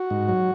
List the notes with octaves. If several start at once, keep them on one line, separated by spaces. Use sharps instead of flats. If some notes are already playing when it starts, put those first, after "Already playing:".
Already playing: F#4
G#2
F#3